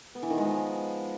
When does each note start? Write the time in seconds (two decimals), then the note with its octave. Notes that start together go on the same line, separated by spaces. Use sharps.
0.15 B3
0.23 E3
0.30 D#3
0.38 G#3
0.45 F3